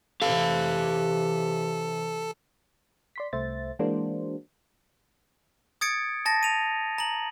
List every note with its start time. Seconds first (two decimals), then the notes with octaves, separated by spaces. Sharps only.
0.22 C3 E3 G4 A4 F5
3.16 D5 C6 B6
3.33 C2 A3 C5 E5 A6
3.79 E3 G#3 A#3 D4 F#4 C5
5.81 D#6 G#6 A6 C#7 D7
6.26 A5 A6 A#6
6.43 D#7 F7
6.98 A#5 F#7